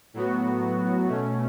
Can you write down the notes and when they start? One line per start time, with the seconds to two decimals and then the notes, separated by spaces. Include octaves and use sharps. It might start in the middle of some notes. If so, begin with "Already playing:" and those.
0.14 A2 F#3 B3 F#4
1.07 B2 A3 C#4